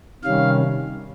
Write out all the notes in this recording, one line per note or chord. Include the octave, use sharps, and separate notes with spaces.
C3 D#3 G3 C#4 F5